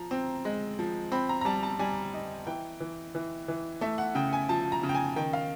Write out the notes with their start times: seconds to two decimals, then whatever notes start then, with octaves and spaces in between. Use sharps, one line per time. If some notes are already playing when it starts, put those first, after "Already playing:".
Already playing: F3 A#5
0.11 C4
0.45 G#3
0.79 F3
1.12 C4 B5
1.29 A#5
1.41 A#5
1.45 G3 A5
1.63 A5
1.79 G3 G#5
2.14 D#4
2.47 E3 G5
2.80 E3
3.15 E3
3.48 E3
3.81 A3 E5
3.98 F#5
4.15 C#3 G5
4.33 G#5
4.49 F3 A5
4.72 A#5
4.83 C#3
4.89 G5
4.94 G#5
5.16 D#3 G5
5.33 F5